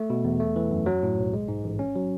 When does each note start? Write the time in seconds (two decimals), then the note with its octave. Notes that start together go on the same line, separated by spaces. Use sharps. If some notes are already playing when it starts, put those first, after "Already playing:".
Already playing: A3
0.10 B2
0.24 E2
0.40 A3
0.56 E3
0.71 F#2
0.86 F#3
1.03 A2
1.18 B1
1.34 G#3
1.48 G#2
1.64 A1
1.79 C#4
1.96 F#3